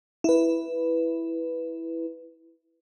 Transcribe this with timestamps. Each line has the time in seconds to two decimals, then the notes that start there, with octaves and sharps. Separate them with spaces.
0.24 E4 B4